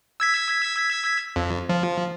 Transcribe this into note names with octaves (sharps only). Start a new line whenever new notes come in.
E6 G#6 B6
F2
F3